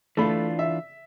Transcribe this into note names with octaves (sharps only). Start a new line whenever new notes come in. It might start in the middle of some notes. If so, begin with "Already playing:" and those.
E3 A3 D4 F4 B5
E5